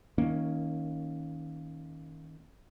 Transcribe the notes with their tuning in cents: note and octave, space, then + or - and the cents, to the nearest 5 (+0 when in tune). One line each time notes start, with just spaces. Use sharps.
D#3 +25 A#3 +0 C#4 +0